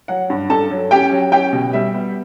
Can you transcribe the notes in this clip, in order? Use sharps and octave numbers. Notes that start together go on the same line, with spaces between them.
F#3 F#5
G2
G2 A4 A5
F#3
C#4 G4 G5
F#3
C#4 G4 G5
B2
G3 E5
B3